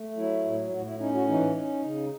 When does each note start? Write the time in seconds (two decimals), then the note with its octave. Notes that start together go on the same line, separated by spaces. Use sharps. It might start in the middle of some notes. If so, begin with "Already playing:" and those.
Already playing: A3
0.17 F#3 E4
0.45 A2
0.69 E4
0.72 A2 F#4
0.86 E4
1.00 C#4 D#4
1.14 F#4
1.28 E3 D#4
1.56 C#4
1.83 C#3